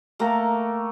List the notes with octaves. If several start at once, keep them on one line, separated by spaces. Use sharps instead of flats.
A3 A#3 G5 A#5